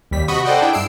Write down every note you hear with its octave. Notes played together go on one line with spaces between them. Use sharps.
D#2 G3 B6
C3 F#4 D#5 B5 C#6 D#6
A4 C5 D5 D#5 F#5 G5
D4 E4 G#4 G5
G2 E6 C7 D7